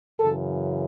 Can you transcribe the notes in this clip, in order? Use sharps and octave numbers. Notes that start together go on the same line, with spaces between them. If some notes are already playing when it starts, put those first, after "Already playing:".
F#2 C#3 E3 A4